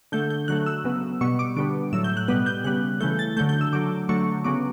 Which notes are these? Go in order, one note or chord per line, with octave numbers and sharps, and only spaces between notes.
D3 A3 G6
G6
D3 F#3 A3 F#6
E6
C#3 F#3 B3
B2 G3 B3 C#6
D6
D3 G3 B3 D6
A2 F#3 A3 E6
G6
F#6
B2 G3 B3 F#6
G6
C#3 G3 B3 F#6
C#3 E3 A3 G6
A6
D3 F#3 A3 G6
G6
E6
D3 F#3 A3 D6
D3 F#3 A3 C#6
C#3 F#3 B3 D6